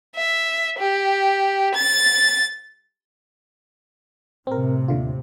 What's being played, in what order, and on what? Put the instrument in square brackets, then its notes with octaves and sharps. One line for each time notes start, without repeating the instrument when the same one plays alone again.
[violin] E5
G4
A6
[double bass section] A2 C3 [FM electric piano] C4 A#4
[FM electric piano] D#2 D3 F4